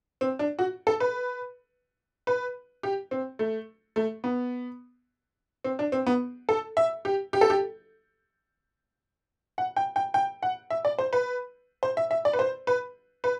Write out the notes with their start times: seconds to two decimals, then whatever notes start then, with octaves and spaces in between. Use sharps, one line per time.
0.21 C4
0.39 D4
0.59 F#4
0.87 A4
1.00 B4
2.27 B4
2.83 G4
3.11 C4
3.39 A3
3.96 A3
4.24 B3
5.64 C4
5.79 D4
5.92 C4
6.07 B3
6.49 A4
6.77 E5
7.05 G4
7.33 G4
7.41 A4
7.50 G4
9.58 F#5
9.76 G5
9.96 G5
10.14 G5
10.43 F#5
10.70 E5
10.85 D5
10.99 C5
11.13 B4
11.83 C5
11.97 E5
12.11 E5
12.25 D5
12.33 B4
12.39 C5
12.67 B4
13.24 B4